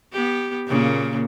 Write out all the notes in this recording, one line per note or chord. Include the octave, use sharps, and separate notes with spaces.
B3 G4
A#2 C#3 A#3